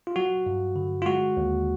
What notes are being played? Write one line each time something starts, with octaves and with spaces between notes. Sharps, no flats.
F4
F#3 F#4
G2
D3
F4
G#3 F#4
D#2